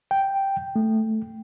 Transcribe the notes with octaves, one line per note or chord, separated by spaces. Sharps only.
G5
A3